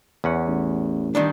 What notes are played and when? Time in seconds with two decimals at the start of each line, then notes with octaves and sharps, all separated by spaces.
0.24 E2 C#4 F#5
0.47 A1
1.15 D#3 G3 D4